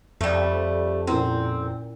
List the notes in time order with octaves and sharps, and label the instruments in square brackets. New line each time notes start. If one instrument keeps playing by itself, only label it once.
[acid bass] F2 [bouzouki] G3 A3
[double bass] A#2 [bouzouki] C4 [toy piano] C#4 E4 A#4